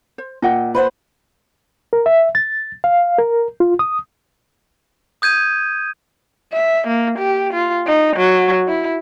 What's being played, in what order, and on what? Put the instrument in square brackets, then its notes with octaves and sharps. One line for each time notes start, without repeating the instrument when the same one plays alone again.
[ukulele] C5
[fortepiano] A#2 [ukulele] D#5 F#5 G5
[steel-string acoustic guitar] B4 C5 F#5
[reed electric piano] A#4
E5
A6
F5
A#4
F4
D#6
[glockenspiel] D#6 G6 G#6 D#7
[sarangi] E5
A#3
G4
F4
D#4
F#3
E4